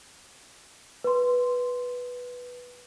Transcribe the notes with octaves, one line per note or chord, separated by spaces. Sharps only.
B4 C6